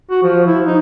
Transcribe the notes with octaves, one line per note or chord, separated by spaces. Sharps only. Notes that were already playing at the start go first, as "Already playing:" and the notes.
F#4
F3
E4
D#4